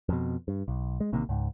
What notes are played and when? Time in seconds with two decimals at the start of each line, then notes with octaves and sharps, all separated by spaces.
0.09 F2 B2
0.48 G2
0.68 B1
1.00 G#3
1.13 A1 C3 D#3 A#3
1.29 C#2 G#2